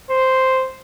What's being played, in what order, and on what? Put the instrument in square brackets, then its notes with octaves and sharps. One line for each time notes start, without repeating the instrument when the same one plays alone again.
[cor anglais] C5